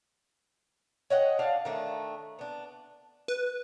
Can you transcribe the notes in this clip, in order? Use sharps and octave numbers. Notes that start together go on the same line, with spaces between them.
C#5 D#5 F#5 G5
D4 F5 F#5
D#3 A3 D4
B3 D4
B4